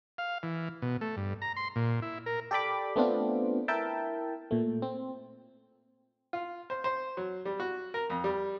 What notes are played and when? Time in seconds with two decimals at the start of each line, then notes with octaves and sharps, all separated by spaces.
0.18 F5
0.43 E3
0.82 B2
1.01 A3
1.17 G2
1.42 A#5
1.56 C6
1.76 A#2
2.02 E4
2.26 A#4
2.51 G4 A4 D5 G5 B5 D6
2.96 A3 B3 C4 D4 F4
3.68 E4 A#4 E5 G5 A5
4.51 A#2 A3
4.82 C4
6.33 F4
6.70 C5
6.84 C5
7.17 F#3
7.45 G3
7.60 F#4
7.94 A#4
8.10 F2
8.24 G3